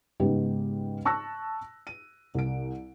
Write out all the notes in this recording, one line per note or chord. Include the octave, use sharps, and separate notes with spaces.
G#2 C#3 G#3 B3 D#4 G4
A5 C#6 E6 F#6 A#6
D#7
C2 D7